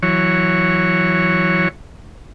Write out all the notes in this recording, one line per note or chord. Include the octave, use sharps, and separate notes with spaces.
E3 F#3 C#5